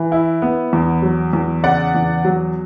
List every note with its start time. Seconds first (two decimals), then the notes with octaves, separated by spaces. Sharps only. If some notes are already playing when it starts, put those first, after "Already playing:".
Already playing: E3
0.12 E4
0.42 B3
0.73 E2
1.02 F#3
1.33 E2
1.64 C#3 D5 F#5
1.95 E2
2.25 F#3